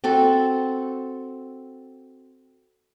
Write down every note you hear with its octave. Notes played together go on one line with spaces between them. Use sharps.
C4 F#4 A4